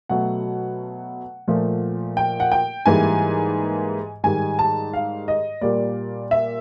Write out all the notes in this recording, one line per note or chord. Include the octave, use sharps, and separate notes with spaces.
B2 F#3 A3 F#5
A#2 F3 A3
G5
F#5
G5
G#2 E3 G3 A#3 G#5
G#2 D#3 G3 G#5
A5
F5
D#5
A#2 G3 A#3 D5
E5